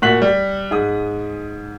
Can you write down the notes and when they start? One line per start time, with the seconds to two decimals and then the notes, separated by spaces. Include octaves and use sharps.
0.02 A#2 F#4 C#6 F#6 B6 F#7
0.22 G3
0.71 G#2 G#4 D#6